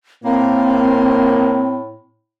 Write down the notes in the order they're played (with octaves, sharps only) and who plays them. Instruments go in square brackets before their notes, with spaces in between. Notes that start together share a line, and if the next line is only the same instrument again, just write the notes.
[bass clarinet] A2 [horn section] A#3 [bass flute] C4